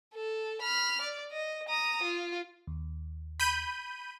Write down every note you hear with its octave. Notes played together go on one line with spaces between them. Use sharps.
A4
B5 F6
D5
D#5
A#5 D#6
F4
D#2
B5 G6 D#7